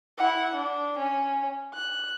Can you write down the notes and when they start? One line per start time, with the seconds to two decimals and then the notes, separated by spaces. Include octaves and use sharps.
0.18 E4 F#5
0.54 D4
0.98 C#4
1.74 F#6